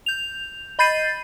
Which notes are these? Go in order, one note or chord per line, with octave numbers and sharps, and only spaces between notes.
G6 F7
D#5 B5 G6 A6 C7 D#7